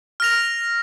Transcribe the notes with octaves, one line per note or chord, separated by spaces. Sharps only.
F6 A#6 F7